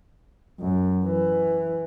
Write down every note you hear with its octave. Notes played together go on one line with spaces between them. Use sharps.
F#2
E3